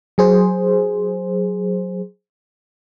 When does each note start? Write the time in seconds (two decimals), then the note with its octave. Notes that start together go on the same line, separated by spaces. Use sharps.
0.18 F#3 G#4 C5